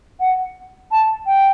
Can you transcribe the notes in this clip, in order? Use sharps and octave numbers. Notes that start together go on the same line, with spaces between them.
F#5
A5
G5